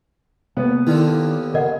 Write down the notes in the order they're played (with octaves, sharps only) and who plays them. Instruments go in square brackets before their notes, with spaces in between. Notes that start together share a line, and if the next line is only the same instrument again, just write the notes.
[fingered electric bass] C3 A#3 [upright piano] B3
[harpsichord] D#2 A#2 D3 [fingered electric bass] D#3 [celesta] E4
[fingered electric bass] C#3 [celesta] A#4 D#5 F#5